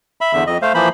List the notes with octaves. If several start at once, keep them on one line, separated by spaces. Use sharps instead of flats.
E5 B5
E2 D3 E5
F2 D#5
A3 C5 F5
E3 F3 A#3 C5 B5